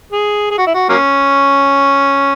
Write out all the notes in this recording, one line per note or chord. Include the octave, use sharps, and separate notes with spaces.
G#4
G#4
F#4
E4
F#4
F#3 A#3 C#4